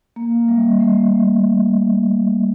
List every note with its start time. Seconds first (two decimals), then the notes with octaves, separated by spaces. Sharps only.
0.16 A#3
0.48 G3
0.80 A3